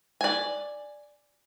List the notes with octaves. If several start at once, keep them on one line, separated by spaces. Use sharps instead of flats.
D5 G#5